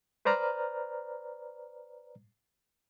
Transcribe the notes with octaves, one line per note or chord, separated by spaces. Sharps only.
B4 C5 D5 A#5 F6